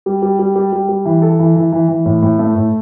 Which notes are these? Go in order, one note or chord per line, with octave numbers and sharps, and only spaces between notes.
G3
G3
G3
G3
G3
G3
E3
A4
E3
E3
E3
E3
A2
A2
A3
A2